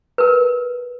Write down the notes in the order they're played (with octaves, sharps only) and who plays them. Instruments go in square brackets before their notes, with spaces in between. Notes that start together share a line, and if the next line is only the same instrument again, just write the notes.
[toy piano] A#4 B4